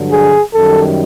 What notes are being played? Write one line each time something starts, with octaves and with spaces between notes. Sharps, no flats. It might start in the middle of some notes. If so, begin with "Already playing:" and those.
Already playing: G2 D3 F#3
G#4
F#2 D#3 G3 A4